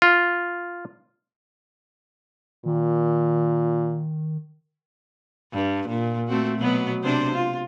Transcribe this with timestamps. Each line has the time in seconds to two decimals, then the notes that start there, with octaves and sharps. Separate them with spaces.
0.02 F4
2.66 A#2 D#3
5.53 G2
5.88 A#2
6.28 A3 C4 F#4
6.58 B2 F#3 B3
7.03 C3 D4 C5
7.34 F4